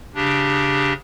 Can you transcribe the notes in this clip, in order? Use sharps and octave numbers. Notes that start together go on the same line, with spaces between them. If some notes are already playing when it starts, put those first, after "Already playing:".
C#3 D4 G4